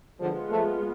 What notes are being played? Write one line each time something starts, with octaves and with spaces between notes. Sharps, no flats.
D3 F3 G#3 B3 F4
F3 A3